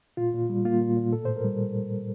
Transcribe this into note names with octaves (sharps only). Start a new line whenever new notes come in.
A#2 F4
A#2
G3
A#3 F4
A#2
A#2
A2 A4
A2 C5
A#4
G3